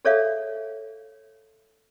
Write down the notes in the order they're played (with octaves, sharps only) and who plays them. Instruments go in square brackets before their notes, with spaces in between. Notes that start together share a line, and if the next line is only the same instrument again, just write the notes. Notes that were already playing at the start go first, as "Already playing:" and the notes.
[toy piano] G#4 A4 C#5 D5 E5 F5